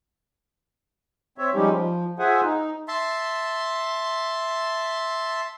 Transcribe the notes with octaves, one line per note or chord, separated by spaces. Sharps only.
C4 C#5 E5
F3 G3 G#3 C#4 D#4 G4
F3
F4 G#4 C5 E5 F#5 G#5
D#4
E5 A5 C6